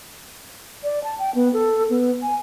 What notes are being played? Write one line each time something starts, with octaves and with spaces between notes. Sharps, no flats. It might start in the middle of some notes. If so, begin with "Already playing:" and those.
D5
A5
G5
B3
A4
B3
G#5